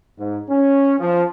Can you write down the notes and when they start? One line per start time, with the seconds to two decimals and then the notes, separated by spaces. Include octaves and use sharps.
0.19 G#2
0.49 C#4
1.00 F3